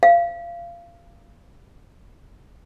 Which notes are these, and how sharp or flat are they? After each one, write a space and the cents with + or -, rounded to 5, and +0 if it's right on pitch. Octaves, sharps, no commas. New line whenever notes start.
F5 -25